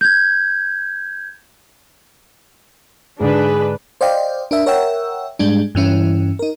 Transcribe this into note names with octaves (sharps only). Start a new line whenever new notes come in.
G6 G#6
G#2 D3 D4 G#4 B4
C5 D5 D#5 F5 G5
D4 A#4 E5
A#4 C#5 E5 F#5 G5 E6
G#2 G3 G#3 D4
G2 E3 C#4 E4
D#4 A#4